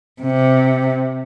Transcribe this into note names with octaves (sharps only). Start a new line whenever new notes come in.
C3